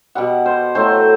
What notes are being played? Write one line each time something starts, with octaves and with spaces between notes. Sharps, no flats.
B2 G3 F#5
C5
A2 F#3 A3 C5